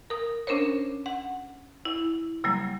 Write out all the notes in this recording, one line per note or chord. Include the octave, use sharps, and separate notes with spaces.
A#4 D#6
C#4 D4 A#4 C5 C#5
F#5
E4
C#3 F#3 G3 A#3